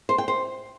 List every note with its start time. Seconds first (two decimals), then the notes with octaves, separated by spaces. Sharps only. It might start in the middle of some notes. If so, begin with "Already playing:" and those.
0.09 C5
0.18 G5
0.28 C5